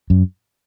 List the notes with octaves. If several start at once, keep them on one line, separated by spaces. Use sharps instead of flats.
F#2